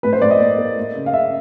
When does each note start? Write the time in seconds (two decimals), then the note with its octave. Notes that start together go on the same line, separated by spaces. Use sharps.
0.03 A2 B4
0.13 C5
0.22 A2 D5
0.31 D#5
0.40 A#3
0.58 A#3
0.76 A3
0.95 C#3
1.06 F5
1.13 C#3 E5